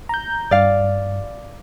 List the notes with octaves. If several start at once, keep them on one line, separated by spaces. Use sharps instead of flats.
A#5 G6
G2 D5 F5